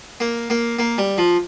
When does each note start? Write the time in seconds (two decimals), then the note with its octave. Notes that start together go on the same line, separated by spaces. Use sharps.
0.20 A#3
0.50 A#3
0.79 A#3
0.98 G3
1.18 F3